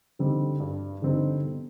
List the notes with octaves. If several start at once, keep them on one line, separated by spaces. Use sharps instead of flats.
D3 G3 C4 D#4
G2
D3 G3 C4 D#4
B2